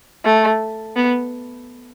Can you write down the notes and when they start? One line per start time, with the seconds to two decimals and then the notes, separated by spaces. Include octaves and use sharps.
0.24 A3
0.96 B3